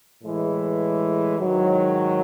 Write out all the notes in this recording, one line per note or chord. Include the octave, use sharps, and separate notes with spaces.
A2 E3 G#3
G#2 D#3 F#3